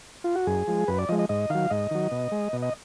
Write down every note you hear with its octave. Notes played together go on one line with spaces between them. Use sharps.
F4
F#4
F#2 G#4
F3 G#3
F#2 B4
D5
F3 G#3 D#5
D#5
G#2 D#5
D#3 F#3 F5
G#2 D#5
D#3 F#3
B2
G#3
B2
D#5